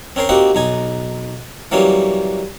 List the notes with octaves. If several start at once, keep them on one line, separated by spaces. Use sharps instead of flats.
C4 C#4 A#4 C5
A#3 C4 D#4 F#4 G4
B1 D#4 G#5
E3 F#3 G3 A#3 C#4